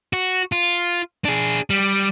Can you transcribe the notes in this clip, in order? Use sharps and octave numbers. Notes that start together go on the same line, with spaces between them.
F#4
F4
D4 G#4
G3